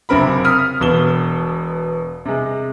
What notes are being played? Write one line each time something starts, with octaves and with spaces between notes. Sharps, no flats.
F#1 C3 C4 A#4 B5
D#6 F6 B6
E1 B2 E7 G7
C3 G#3